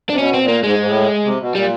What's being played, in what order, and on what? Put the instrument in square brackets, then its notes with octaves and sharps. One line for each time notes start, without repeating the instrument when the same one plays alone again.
[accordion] C3 [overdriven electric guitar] D4
[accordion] B2 [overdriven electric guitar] C#4
[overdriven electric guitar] C4
[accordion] A#2
[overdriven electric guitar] A#3
[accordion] G#2 [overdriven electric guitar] G#3
[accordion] G#2
A2
C3
B2
[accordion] A#2 [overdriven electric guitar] G3